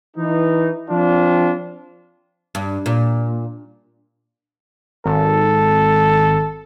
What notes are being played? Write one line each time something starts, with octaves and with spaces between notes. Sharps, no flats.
E3 D#4
F3 C4 D4 F4
G2
A#2
G#1 A4